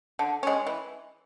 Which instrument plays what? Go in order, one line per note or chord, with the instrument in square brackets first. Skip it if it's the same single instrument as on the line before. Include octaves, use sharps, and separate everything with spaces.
[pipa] D3
G#3 C#4
E3